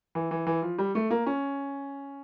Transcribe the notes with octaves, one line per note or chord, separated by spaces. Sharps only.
E3
E3
E3
F3
G3
A3
A#3
C#4